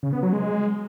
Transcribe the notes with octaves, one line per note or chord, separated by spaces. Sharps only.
C#3
B3
F#3
G#3